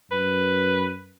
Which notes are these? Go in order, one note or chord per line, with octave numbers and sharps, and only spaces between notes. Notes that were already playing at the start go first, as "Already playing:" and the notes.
F#2 B4